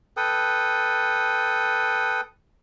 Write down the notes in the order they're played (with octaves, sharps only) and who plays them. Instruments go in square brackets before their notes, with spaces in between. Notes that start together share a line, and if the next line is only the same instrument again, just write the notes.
[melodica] A4 B4 G5 D#6